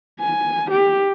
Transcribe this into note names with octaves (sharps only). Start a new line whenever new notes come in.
G#5
G4